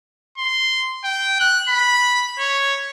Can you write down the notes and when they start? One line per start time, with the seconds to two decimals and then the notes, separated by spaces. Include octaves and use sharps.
0.38 C6
1.04 G5
1.40 F#6
1.69 B5
2.39 C#5